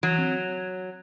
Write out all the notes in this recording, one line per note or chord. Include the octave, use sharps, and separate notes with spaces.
E3 F#3
C4